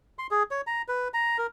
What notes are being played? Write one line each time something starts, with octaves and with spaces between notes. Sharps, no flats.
C6
G#4
C#5
A#5
B4
A#5
A#4